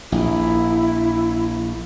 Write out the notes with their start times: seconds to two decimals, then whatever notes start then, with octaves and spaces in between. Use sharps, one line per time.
0.12 A#1 E4